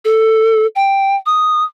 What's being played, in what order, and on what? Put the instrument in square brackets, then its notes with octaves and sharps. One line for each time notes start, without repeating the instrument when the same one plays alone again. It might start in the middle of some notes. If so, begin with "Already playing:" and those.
[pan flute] A4
G5
D#6